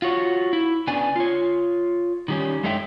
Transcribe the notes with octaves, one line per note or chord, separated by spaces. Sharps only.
F4 F#4 C#5
E4
C#3 B3 D4 G#5
F4 C#5
D#3 G3 C#4
F#2 G#3 A4 C#5 E5 G5